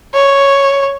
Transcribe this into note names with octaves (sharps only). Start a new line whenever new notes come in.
C#5